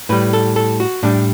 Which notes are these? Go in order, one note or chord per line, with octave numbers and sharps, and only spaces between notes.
A2 G3 B4
A4
A4
F#4
A2 G3 D4